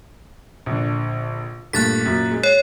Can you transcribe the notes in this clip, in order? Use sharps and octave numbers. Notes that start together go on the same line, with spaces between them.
A#1 D3
G2 A#2 A3 F#6 A6 B6
F#2 A#2
G#3
C#5 C7